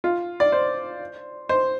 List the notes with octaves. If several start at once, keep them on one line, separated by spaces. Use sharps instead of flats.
F4
D5
C5
C5